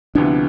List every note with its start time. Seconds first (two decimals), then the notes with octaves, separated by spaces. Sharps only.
0.15 D2 C3 F3 B3 D4 E4